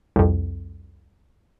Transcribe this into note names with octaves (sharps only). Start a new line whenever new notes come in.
C2 F2